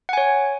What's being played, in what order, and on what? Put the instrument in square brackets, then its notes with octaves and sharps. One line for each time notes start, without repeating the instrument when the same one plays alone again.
[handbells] F#5
G#5
C#5